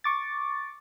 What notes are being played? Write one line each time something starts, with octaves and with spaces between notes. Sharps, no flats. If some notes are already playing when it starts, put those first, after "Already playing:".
C#6 D6 A6